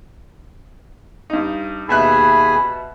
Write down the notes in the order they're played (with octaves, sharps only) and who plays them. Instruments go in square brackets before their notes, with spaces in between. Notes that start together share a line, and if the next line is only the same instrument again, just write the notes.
[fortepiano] G2 D#4
[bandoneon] D#2 G#4 G#5 [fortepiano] B2 E5 F#6 [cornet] B5